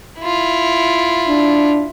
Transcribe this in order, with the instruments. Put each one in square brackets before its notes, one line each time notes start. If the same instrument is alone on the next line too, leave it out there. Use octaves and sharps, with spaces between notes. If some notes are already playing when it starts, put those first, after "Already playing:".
[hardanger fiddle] E4 F4
[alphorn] D4